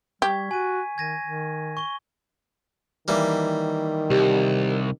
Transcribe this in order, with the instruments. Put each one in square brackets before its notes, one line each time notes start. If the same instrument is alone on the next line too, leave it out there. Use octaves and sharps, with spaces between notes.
[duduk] G3 [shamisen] G4 [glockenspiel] C#6 G#6 B6
[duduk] F#4 [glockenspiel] G#5 D#7
[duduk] D#3 [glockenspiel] G#6 A#6 D#7
[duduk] D#3
[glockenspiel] C#6 G7
[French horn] D#3 [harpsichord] E3 G3 A#3
[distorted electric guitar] C2 [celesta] G4